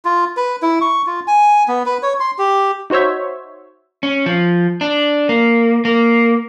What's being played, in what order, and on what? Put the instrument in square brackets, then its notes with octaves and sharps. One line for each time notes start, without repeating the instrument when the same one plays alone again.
[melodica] F4
B4
E4
C#6
F4
G#5
B3
B4
C#5
C6
G4
[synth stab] D#4 F#4 C5 C#5 E5
[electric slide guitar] C#4
F3
D4
A#3
A#3